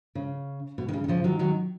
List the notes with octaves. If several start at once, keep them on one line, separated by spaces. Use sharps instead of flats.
C#3
B2
D#3
C#3
D#3
C#3 F3
D#3 F#3
D#3 F#3